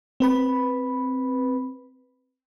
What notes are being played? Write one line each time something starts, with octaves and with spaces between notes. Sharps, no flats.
C4 B4 B5